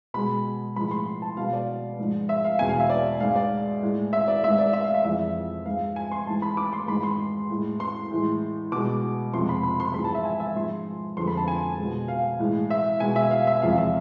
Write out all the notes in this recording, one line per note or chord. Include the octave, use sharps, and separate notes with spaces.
B2 G#3 B5
A2 F3 G#3 B5
C6
A5
B2 G#3 F5
D5
G#2 F3 G#3
E5
F5
E2 B2 G#3 G#5
F5
E5
D5
G#2 G#3 F5
D5
A2 G#3
E5
D5
G#2 G#3 E5
D5
E5
F5
E5
F2 E3 G#3 E5
G#2 G#3 F5
G#5
C6
G#2 E3 G#3 A5
B5
D6
C6
G#2 E3 G#3 B5
C6
A2 G#3
C6
A2 E3 G#3
B2 G#3 D6
F2 C3 F3 G#3 C6
B5
B5
C6
G#2 E3 G#3 B5
A5
E5
G#5
E5
G#2 F3 G#3 C6
F2 D3 F3 G#3 C6
B5
A5
G#5
B2 G#3
F5
A2 E3 G#3
E5
B2 G#3 G#5
E5
F5
E5
E2 C3 F3 G#3 F5
E5